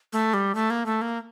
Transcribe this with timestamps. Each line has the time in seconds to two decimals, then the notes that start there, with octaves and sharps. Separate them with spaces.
0.13 A3
0.34 G3
0.55 A3
0.70 A#3
0.86 A3
1.01 A#3